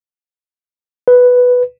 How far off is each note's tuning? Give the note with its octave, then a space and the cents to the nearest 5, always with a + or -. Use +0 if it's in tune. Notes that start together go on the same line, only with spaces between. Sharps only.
B4 +0